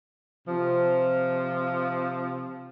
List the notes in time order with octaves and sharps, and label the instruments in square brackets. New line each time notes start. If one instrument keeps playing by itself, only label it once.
[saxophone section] C3 F3